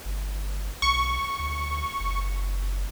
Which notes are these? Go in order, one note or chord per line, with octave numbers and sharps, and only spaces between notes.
G1
B1 C#6
D2
F#1